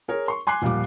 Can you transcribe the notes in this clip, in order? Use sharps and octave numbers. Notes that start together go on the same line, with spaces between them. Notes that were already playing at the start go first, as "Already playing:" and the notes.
G#4 A#4 C#5
C6 C#6
G#5 C6 D6 F#6 C7
D#1 A#2 F3 G3 D6